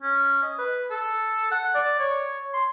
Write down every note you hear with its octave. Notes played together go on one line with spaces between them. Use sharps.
C#4
D#5
B4
A4
F#5
D5
C#5
C6